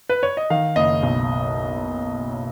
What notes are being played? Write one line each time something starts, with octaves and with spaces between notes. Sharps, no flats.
B4
C#5
D#5
D#3 F5
F#1 D#5
B1